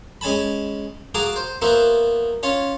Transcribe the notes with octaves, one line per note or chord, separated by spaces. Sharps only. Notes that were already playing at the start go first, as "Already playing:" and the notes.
G#3 C#4 G#5 A5 B5
F#4 G#4 F5 A5 A#5 D6
C5
A#3 B3 F#4 C5 E5
C#4 F4 C#5